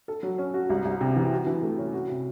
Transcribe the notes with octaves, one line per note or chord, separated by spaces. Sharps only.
A4
F#3
C#4
F#4
C2
C2
C3
E3
F#4
E3
A3
C#4
F#4
C3